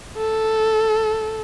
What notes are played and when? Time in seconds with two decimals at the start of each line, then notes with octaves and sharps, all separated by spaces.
0.18 A4